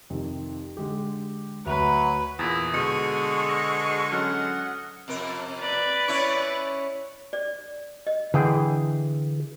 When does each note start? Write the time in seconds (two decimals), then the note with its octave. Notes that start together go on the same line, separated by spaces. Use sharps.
0.10 F2 C3 D#3
0.77 D3 G#3 G4
1.66 D2 F#3 B4 E5 F7
2.39 E2 A#2 E4 D#6 A6 A#6
2.74 B2 D3 G#3 C#6 C#7 D#7
3.49 A#6
4.12 F#3 C#4 A4 F#5 F6
5.08 F2 C3 A#4
5.61 B4 D5
6.08 C#4 E4 C#5
7.33 D5
8.07 D#5
8.34 D3 E3 G#4 G5